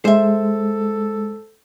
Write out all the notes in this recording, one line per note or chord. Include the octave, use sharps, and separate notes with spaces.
G#3 A4 C5 E5